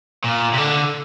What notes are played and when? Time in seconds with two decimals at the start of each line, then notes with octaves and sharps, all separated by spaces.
0.24 A#2
0.53 C3
0.58 D3